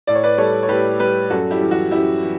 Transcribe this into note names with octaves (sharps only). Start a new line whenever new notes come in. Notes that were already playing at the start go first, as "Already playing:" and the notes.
A2 D5
C#5
B4 D5
G3 A4 C#5
C#5
A2 G4 B4
G3 G4 B4
F#2 F#4 A4
E4 G4
E3 G3
F#4
F#2 E4 G4
E3